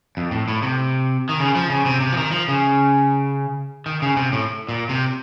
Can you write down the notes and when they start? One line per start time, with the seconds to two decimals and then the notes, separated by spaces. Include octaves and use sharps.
0.17 F2
0.31 A2
0.48 A2
0.63 C3
1.29 D#3
1.40 C#3
1.56 F3
1.70 C#3
1.86 C3
2.01 C3
2.12 F3
2.17 D#3
2.32 F3
2.48 C#3
3.86 D#3
4.02 C#3
4.17 C3
4.32 A2
4.69 A#2
4.89 C3